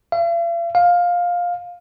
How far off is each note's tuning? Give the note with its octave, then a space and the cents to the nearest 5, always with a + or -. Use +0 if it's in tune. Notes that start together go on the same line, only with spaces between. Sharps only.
F5 -45
F5 +15